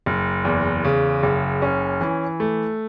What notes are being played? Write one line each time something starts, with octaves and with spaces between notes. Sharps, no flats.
F#1
E2
C#3
F#1
C#4
E3
A3